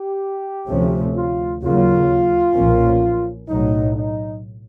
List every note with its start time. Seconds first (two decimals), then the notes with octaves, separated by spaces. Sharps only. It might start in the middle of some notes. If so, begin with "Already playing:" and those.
Already playing: G4
0.68 D2 C3 F3 A3 C#4
1.14 F4
1.61 D#2 C#3 F#3 A#3 F4
2.55 B1 A#2 F3 A#3 C#4
3.49 B1 A2 F#3 D#4
3.95 D#4